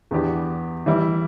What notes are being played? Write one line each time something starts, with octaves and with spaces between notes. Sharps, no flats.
E2 E3 B3 D4 G4
E3 G3 E4